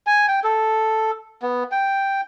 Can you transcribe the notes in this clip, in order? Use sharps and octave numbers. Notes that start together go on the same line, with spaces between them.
G#5
G5
A4
B3
G5